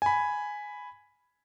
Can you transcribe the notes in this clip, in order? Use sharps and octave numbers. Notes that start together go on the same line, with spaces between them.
G#5 B5